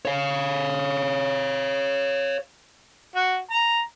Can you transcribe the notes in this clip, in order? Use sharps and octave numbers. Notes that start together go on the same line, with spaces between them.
C#5 F5
F#4
A#5